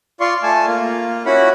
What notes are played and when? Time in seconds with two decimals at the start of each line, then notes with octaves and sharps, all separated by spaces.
0.20 F4 D5 C6 C#6
0.43 A3 G#5 A5
0.67 A#3 F4
1.26 C#4 E4 F#4 F#5 B5